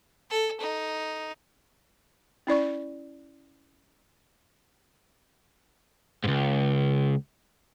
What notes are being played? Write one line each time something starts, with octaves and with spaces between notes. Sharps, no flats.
A4
D#4
C#4 E4 D5 C#6
C#2 G#2